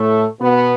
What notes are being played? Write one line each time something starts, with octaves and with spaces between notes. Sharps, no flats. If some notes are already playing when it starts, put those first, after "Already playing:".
Already playing: A2 A3
B2 B3